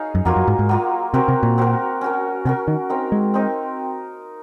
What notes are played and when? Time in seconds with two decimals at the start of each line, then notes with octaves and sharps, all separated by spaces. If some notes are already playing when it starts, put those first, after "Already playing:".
Already playing: D#4 G#4 C#5 F5
0.15 F#2
0.25 F2 F#3 A#3 F4
0.36 F#2
0.48 G#2
0.59 G#2
0.69 F#3 A#3 F4
1.14 C3 C4 F#4 A#4
1.28 C3
1.43 A#2
1.58 C4 F#4 A#4
2.01 C#4 F#4 A#4
2.45 C3 C#4 F#4 A#4
2.68 D#3
2.89 C4 D#4 A#4
3.12 G#3
3.34 C4 D#4 A#4